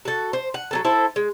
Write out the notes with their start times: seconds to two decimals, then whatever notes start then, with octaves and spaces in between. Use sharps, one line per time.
0.05 F#4 A4
0.33 C5
0.54 F#5
0.71 F#3 B3 A4
0.85 E4 A4 C5
1.16 G#3